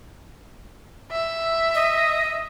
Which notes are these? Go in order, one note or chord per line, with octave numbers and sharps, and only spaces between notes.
E5
D#5